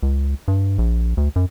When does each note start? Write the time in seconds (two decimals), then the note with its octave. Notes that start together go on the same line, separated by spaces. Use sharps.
0.03 C#2
0.48 G2
0.78 A#1
1.17 D2
1.36 F#2